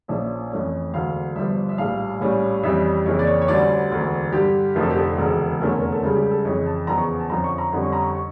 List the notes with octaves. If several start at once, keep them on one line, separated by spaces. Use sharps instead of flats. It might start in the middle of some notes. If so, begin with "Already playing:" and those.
A#1 A#2 F3 C#4 E5
F2 E3 A3 C#4
E1 D2 D3 F5
G1 G2 F3 E5
E5
A#1 A2 G3 F5
A#1 A2 G3 C#4
F2 E3 G3 C#4 E5
F2 C#3 E3 A#3 C#5
D5
C#5
C#5
D2 D3 G3 C#4 D5
E1 D2 D3
G2 D3 G3 G4
F1 F2 D3 F3 A3 A#4
A4
G4
A4
E1 D2 C#3
F1 E2 D3 A3 C#4 A#4
C#5
A#4
A4
C#2 C#3 G3
G4
A4
F2 C#3 E3 C#5
A5
E2 C#3 F3 A#5
C#6
C#6
A5
F2 D3 F3 C#4 A#5
C#6
A#5
F2 D3 G3 C#4
C#6
A#5
C#6
C#6